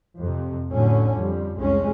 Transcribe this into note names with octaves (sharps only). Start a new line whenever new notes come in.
F2 C3
A2 D3 F#3 C#4
F2 G3
C2 F2 G#3 C#4